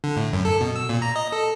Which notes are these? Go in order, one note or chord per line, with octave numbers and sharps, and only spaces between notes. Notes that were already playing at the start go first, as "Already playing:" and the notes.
D3
A2
F#2
A4
B2
E6
A#2
A#5
D#5
A4